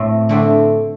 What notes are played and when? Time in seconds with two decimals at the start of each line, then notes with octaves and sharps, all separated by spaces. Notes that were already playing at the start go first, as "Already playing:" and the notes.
Already playing: A2 A3 C4
0.29 D3 A3 C4